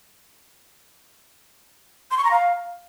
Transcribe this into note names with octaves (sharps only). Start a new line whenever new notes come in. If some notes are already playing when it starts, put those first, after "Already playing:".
C6
C#6
A#5
F5